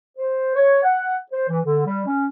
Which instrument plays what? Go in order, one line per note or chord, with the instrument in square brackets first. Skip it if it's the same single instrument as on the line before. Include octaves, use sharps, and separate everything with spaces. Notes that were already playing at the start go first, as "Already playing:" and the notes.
[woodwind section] C5
C#5
F#5
C5
E3
D3
G3
C#4